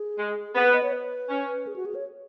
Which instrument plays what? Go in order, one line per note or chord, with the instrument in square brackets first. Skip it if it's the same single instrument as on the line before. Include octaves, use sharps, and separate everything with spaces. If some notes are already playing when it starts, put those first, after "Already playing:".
Already playing: [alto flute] G#4
[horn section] G#3
[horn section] B3 [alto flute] G#4
[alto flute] B4
D#5
C#5
B4
[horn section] C#4
[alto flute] G#4
F#4
G#4
C#5